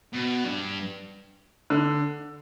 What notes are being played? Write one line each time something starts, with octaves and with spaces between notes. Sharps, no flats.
B2
G2
D3